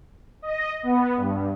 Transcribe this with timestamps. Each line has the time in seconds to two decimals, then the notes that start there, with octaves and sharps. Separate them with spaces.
0.42 D#5
0.83 B3
1.16 G2